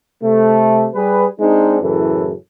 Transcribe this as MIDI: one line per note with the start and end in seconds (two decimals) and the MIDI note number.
0.23 0.87 48
0.23 0.87 57
0.95 1.25 55
0.95 1.25 68
0.95 1.25 71
1.40 1.78 56
1.40 1.78 60
1.40 1.78 62
1.40 1.78 63
1.82 2.33 42
1.82 2.33 45
1.82 2.33 49
1.82 2.33 52
1.82 2.33 69